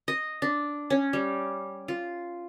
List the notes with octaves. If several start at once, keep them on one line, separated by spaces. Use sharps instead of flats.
D#5
D4
C#4
G3
F4